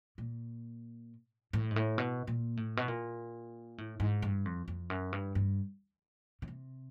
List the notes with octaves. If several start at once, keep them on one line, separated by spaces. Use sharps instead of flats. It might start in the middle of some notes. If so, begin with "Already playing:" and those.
A#2
A2
G#2
A2
B2
A#2
A2
B2
A#2
A2
G#2
G2
F2
F2
F#2
G2
G2
C#3
C3